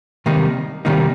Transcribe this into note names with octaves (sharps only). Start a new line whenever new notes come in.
C3 D#3 G3 A#3 D#4
C3 D#3 G3 A#3 D#4